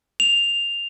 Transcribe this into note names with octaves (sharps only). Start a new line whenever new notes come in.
F7